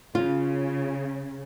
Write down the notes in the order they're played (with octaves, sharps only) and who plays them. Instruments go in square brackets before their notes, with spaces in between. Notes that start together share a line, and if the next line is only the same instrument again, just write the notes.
[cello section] C#3 [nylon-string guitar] F4